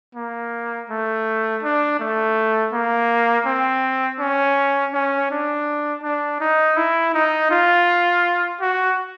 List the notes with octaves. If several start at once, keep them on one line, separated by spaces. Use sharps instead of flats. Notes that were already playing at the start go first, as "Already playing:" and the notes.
A#3
A3
D4
A3
A#3
C4
C#4
C#4
D4
D4
D#4
E4
D#4
F4
F#4